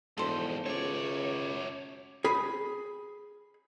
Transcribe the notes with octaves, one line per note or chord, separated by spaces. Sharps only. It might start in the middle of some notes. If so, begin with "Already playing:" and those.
E1 F2 G#2 A4 C5
C#2 F#2 C#5 D5
G#4 B5